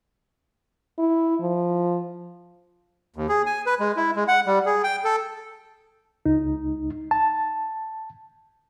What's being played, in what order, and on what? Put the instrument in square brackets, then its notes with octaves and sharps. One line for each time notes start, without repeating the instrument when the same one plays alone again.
[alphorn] E4
F3
[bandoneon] D#2
G#4
G#5
B4
G#3
E4
G#3
F#5
G3
G#4
G5
A4
[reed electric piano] C#2 D#4
A5